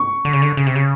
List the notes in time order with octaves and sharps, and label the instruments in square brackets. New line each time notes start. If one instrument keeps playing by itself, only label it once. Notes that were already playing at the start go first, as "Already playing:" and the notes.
Already playing: [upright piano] C#6
[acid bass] D3
C#3
D3
C#3
C3
C#3